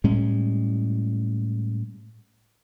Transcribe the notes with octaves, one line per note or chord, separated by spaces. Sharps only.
A2 G3 G#3 C#4